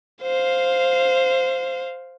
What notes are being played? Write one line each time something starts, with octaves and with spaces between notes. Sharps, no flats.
C5 F5